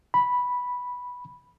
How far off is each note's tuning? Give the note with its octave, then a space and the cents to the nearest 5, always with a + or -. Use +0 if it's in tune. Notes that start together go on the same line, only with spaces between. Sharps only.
B5 -5